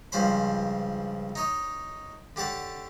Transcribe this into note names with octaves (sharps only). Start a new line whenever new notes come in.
C#2 G2 F3 C#4 C5 B5
D#4 C#5 D#5
D3 G4 C#5 F#5 A5